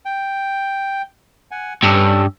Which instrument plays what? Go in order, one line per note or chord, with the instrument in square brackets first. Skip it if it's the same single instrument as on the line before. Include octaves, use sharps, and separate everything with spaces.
[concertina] G5
F#5 G#5
[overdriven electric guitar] G2 [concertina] C#4 A4